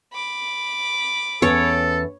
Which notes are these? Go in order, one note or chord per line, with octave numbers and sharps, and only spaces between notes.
B5 D6
E2 B3 C#4 A4 C#5